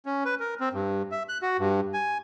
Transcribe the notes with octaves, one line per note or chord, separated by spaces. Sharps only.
C#4
B4
A#4
C4
G2
E5
F#6
F#4
G2
G#5